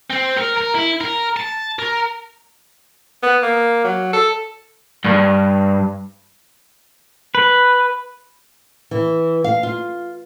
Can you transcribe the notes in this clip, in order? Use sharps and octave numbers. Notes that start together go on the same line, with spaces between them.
C4
A#4
A#4
E4
A#4
A5
A#4
B3
A#3
F#3
A4
G2
B4
E3
F5
F4